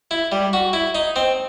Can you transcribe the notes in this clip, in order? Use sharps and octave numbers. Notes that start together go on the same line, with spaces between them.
E4
G3
F#4
E4
D#4
C4